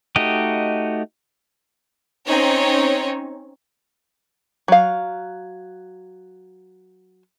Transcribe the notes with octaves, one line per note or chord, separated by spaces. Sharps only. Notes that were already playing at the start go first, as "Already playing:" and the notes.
A3 D#4 F#4 G4 D#5
C4 C#4 D#4 C#5
F#3 F5